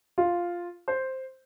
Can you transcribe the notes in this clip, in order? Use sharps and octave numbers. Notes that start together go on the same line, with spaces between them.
F4
C5